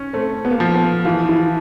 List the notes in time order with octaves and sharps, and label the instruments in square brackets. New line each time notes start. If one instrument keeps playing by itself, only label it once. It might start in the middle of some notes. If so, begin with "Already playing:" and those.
Already playing: [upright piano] C#4
[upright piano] A3 [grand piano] C4
[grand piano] B3
A#3
[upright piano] F3 [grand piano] B3
[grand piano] B3
[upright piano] E3 [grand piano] F4
[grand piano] E4